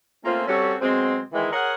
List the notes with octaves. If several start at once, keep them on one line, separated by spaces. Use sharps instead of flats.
A3 A#3 C4 C#4 F4
G3 C4 C#4 F#4 A4 C#5
B2 F#3 G#3 C4
D#3 E3 G#3
G#4 A#4 C#5 F#5